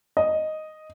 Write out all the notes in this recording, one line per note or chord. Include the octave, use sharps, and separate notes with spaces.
D#5